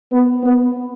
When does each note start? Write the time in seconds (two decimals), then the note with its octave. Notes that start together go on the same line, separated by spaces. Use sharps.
0.12 B3
0.44 B3